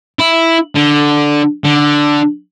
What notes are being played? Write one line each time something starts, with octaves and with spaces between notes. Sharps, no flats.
E4
D3
D3